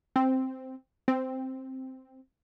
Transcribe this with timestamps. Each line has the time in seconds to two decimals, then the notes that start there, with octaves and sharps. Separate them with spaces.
0.16 C4
1.08 C4